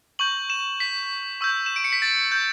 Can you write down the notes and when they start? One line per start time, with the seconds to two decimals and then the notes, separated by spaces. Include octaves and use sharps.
0.19 C#6 G6 F#7
0.50 E7
0.80 B6
1.41 C#6 E6 G6
1.66 E7
1.76 D7
1.84 C#7
1.92 B6
2.02 A6
2.32 G6